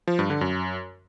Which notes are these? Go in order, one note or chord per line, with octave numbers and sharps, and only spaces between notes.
F3
G2
D3
F#2